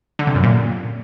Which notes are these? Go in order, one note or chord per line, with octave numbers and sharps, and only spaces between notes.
D3
C3
F#2
A#2